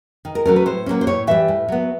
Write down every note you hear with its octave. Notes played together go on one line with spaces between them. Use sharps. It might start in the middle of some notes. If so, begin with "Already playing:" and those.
D#3
A#4
F#3 A3 C#4 A#4
B4
A2 C5
F#3 A#3 C#4
C5
A2 C#5
E3 G3 E5
A2
F#3 B3